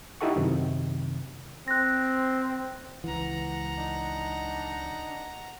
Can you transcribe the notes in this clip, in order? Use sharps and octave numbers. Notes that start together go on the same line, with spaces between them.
D#4 E4 G4 A4 F#5 C#6
F#2 C3 D#3
C4 F#6 A#6
C#2 E3 F#5 A#5
D4 D#4